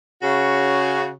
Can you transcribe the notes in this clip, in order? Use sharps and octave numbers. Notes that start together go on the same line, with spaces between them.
C#3 F#4